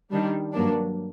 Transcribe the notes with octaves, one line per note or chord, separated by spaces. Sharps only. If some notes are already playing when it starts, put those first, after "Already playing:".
D#3 G3 D4
G2 F#3 A#3 D4